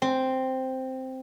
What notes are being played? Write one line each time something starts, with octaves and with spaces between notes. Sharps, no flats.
C4